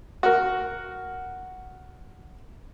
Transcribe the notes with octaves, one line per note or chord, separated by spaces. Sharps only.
F#4 A#4